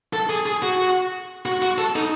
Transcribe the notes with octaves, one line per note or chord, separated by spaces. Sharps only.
A4
G#4
G#4
F#4
F#4
F#4
A4
D#4